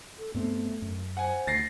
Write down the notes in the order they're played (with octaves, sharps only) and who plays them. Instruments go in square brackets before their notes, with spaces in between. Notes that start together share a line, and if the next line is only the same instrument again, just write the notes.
[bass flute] A4
[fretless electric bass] G2 B3 C4 [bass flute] A3
[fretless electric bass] F#2
[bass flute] C5 [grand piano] F#5 G#5
[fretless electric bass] D2 [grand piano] A6 A#6 C7